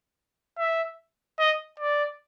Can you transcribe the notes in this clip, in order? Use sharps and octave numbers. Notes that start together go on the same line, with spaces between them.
E5
D#5
D5